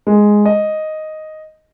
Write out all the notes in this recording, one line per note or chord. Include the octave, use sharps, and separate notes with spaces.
G#3
D#5